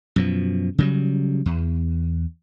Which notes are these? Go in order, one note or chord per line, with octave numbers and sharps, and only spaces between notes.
F#2 B2 F3
C#3 F#3 G3
E2